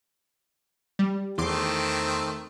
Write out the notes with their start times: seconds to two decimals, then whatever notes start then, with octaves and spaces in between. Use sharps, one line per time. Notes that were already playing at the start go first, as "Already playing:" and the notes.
0.99 G3
1.38 E2 D#3 A3 C4 C6 D6